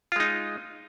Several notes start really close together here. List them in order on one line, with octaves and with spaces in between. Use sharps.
F4 G#3 D#4